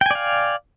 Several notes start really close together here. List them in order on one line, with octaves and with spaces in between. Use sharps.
G5 G#5 D5 F5